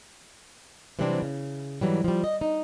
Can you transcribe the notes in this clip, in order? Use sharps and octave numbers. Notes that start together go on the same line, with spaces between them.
C3 E3 F#3 G3 C4 D4
C#3
G#2 E3 F#3 G3
F3 G3
D#5
D#4